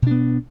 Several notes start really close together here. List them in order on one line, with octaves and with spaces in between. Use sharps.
B2 D4 B3